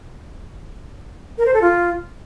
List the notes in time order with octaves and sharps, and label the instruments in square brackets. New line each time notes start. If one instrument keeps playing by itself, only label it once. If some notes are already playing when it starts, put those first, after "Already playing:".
[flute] A#4
C5
A4
F4